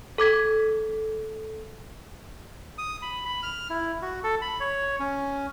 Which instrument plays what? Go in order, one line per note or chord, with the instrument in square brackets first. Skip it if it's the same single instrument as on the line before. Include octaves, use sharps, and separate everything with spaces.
[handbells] A4 D6 G#6 B6
[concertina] D#6
B5
B5
F6
E4
F#4
A4
B5
C#5
C#4